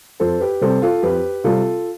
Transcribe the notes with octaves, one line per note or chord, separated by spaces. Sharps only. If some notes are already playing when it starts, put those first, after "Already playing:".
F2 A4 C5
G4 B4
C3 G3 C4 A4 C5
F4 A4
F2 G4 B4
C3 G3 C4 F4 A4